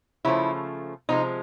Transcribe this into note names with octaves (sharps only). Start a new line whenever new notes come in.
C#3 F3 A3 E4
C3 F3 G#3 D#4